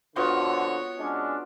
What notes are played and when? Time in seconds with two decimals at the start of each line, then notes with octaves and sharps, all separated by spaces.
0.16 F2 D3 B3 F4 F#4 C#5
0.98 G#3 C#4 D4